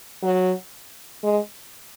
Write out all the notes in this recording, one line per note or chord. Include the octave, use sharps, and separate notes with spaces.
F#3
G#3